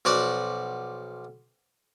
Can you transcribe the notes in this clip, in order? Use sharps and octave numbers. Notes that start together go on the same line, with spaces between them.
B1 F3 F#4 D5 F#5